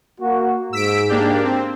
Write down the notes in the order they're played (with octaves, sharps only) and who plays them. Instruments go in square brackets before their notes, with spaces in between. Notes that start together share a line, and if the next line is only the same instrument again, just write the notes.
[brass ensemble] A#3 F#4
[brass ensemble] G#2 [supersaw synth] E6 B6 D7
[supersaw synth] A#3 D4 G4
C4